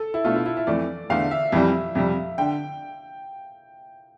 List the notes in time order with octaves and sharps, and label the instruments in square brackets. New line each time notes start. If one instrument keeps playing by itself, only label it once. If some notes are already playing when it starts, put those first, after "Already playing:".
Already playing: [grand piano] A4
E4
[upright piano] B2 A3 D4 [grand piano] F4
[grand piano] E4
E4
E4
[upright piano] F2 E3 A3 [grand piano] D5
[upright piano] E2 D3 A3 D4 [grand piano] F5
[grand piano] E5
[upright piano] F2 E3 G3
F2 C3 G3
[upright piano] D3 [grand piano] G5